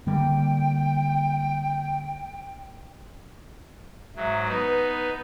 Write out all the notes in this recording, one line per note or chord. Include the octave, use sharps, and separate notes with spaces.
D3 G3 A#3 G5
G#2 F#3 E5
B3 D#4 B4